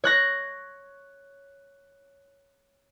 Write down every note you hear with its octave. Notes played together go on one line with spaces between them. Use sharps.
C#5 F#6 A#6